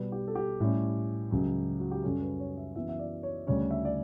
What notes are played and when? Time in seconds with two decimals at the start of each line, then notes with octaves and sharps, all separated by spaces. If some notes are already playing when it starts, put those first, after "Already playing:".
Already playing: B2 G3 B3 B4
0.12 G4
0.28 A4
0.35 G4
0.60 A2 G3 C#4
1.31 C#2 C#3 F#3
1.80 F#4
1.91 G4
2.03 F#2 C#3 G3 C#4 A4
2.22 B4
2.39 C#5
2.58 E5
2.75 F#2 E3 B3 E5
2.89 E5
2.99 D5
3.23 C#5
3.47 D2 C#3 G3 C#4 C#5
3.71 E5
3.85 D5